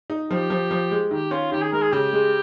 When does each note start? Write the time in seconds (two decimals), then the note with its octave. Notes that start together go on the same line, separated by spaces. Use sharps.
0.10 D#4
0.30 F3 G4
0.50 F3
0.71 F3
0.91 G#3
1.11 D#3 G4
1.31 C#4 F4
1.52 D#3 G4
1.62 G#4
1.72 G#3 A#4
1.82 G#4
1.93 C#3 G4
2.13 G#3